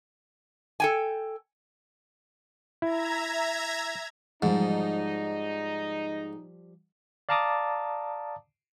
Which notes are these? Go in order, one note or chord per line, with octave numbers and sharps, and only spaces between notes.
A4 G5 G#5
E4 E5 A#5 G#6
G#2 F3 G3 D#4
D5 F5 A5 A#5 D6 D#6